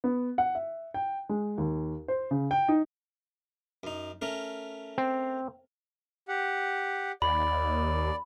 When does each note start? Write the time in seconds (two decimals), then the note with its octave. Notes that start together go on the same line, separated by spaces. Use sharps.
0.04 B3
0.38 F#5
0.55 E5
0.94 G5
1.29 G#3
1.58 D#2
2.08 C5
2.31 C#3
2.51 G5
2.68 D#4
3.83 F#2 D#4
4.22 A3 C#4 A#4
4.98 C4
6.28 G4 F#5
7.22 D#2 D5 B5